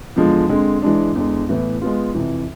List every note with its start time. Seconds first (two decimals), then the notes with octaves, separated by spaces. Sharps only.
0.16 E2 D3 F3 G#3
0.49 D3 G#3 C4
0.82 E3 G#3 D4
1.16 E2 D3 G#3
1.49 A2 E3 B3
1.81 G#3 B3 F4
2.15 F2 C3 E3